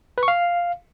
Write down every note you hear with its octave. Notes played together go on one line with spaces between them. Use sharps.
B4
C#6
F5